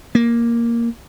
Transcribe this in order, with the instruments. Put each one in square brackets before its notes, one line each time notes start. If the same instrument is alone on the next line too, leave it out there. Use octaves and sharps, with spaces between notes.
[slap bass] A#3